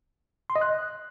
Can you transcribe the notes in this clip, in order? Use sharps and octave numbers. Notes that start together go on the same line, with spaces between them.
C6
D#5
F#6